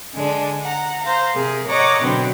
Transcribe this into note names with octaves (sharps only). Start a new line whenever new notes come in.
D3 G#3 D4
F#5 A#5
C5 F5 A#5
C3 G#4 A#4
C#5 D#5 F#5 A#5 D6
B2 D3 F#3 B3 C4